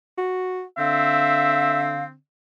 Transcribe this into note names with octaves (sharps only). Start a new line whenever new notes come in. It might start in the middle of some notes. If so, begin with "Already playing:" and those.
F#4
D3 C4 E5 F5